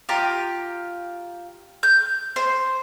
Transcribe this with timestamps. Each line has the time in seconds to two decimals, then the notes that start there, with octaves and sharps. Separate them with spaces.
0.09 F4 G4 A#5
1.83 G6
2.36 C5